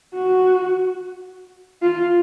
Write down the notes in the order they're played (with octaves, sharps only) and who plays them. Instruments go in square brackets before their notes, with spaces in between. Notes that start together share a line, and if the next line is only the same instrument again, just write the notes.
[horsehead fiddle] F#4
F4